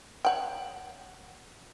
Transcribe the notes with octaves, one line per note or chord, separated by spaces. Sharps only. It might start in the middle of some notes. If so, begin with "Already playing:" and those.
C#5 F#5 G5